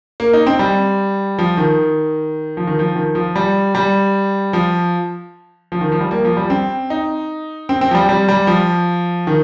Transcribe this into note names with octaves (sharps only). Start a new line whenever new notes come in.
A#3
D#4
C4
G3
F3
D#3
F3
D#3
F3
D#3
F3
G3
G3
F3
F3
D#3
F3
G3
A#3
F3
G3
C4
D#4
C4
C4
F3
G3
G3
G3
F3
D#3